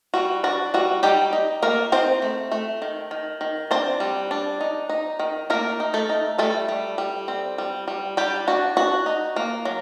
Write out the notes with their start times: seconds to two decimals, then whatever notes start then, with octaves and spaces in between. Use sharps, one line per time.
0.14 G3 F#4
0.44 D4 F#4
0.74 G3 F#4
1.03 G3 D#4 G4
1.33 D#4
1.62 A3 A#3 A#4
1.92 C4 D#4 C5
2.22 A3
2.52 A3
2.82 D#3
3.11 D#3
3.41 D#3
3.71 C4 D4 C5
4.00 G3
4.31 D4
4.61 D#4
4.89 D#4
5.19 D#3
5.50 A3 A#3 A#4
5.80 D#4
5.94 A3 A4
6.09 D#4
6.38 G3 A3 A4
6.69 G3
6.98 G3
7.28 C4
7.58 G3
7.88 G3
8.17 G3 D4 G4
8.48 D4 F#4
8.77 D4 F#4
9.06 D#4
9.36 A#3
9.65 F#3